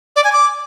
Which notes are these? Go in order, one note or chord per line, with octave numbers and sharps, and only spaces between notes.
D5
G#5
D6